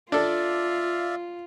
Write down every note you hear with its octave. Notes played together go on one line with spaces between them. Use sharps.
D4 F4 A4 D5 E5 F5